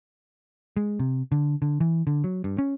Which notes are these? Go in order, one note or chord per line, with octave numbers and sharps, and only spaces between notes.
G#3
C3
D3
D3
E3
D3
F#3
G2
C#4